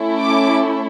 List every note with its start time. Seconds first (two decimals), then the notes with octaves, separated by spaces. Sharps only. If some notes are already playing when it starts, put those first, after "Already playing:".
Already playing: A3 C#4 E4
0.21 D6